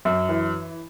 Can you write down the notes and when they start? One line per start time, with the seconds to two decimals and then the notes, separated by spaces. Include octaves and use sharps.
0.05 F#2
0.29 E3